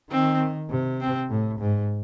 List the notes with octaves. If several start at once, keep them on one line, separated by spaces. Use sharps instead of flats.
D#3 C4
C3
C4
A2
G#2